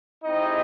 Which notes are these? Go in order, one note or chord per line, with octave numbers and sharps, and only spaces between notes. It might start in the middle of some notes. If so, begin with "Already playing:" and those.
G#3 C4 D#4 E4 G4 D#5